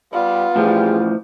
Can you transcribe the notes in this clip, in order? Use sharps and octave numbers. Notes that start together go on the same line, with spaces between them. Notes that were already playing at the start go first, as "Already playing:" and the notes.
G3 B3 F4
A2 E3 F3 G3 G4 G#4